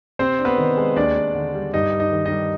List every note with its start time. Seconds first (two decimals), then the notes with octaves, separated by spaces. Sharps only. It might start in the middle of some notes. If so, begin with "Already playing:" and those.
0.19 C3 C4 C5
0.39 D4
0.45 B3 B4
0.58 D#3
0.77 G#3
0.96 D#2 D4 D5
1.16 D#2
1.35 D3
1.55 G3
1.74 G2 D#4 D#5
1.93 G2
1.99 D#4 D#5
2.12 D#3
2.25 D#4 D#5
2.32 G3